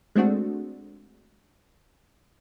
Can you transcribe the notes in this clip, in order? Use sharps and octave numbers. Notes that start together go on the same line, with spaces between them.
G#3 A3 C4 D4 F#4